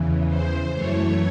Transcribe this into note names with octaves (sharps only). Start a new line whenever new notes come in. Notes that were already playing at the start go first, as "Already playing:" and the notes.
Already playing: E2 C#3 E3
C5
F#2 E3 A3 C#5